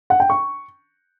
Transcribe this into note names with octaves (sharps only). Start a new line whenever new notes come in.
F#5
G5
C#6